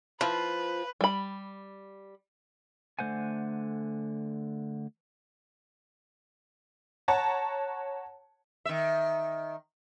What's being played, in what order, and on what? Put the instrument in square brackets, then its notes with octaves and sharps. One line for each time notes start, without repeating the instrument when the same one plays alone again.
[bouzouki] F3 [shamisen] E4 F4 [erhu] B4
[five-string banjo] G3 B5
[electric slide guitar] D3 A3 C5 F#5 G#5
[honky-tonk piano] C#5 F#5 A5 A#5
[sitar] D#3 E5